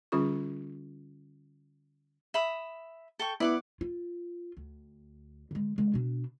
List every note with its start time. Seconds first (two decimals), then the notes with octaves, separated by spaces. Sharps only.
0.12 D3 G3 C#4 F4 G#4 C#6
2.34 E5 B5 D#6
3.19 A4 G5 C#6
3.40 B3 E4 D5 F#5 D6
3.81 F4
4.57 D2
5.51 D3 G#3
5.78 D3 G#3
5.94 B2 D4